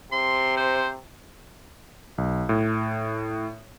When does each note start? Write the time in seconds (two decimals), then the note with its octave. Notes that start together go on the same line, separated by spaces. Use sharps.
0.12 C3 C6
0.57 C5
2.18 B1
2.49 A2